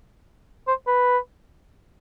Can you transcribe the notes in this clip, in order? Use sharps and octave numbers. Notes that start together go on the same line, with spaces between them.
C5
B4